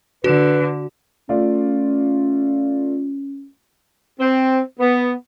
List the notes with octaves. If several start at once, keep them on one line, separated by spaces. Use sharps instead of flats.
D3 F#4 B4
A3 C#4 F4 D5
C4
B3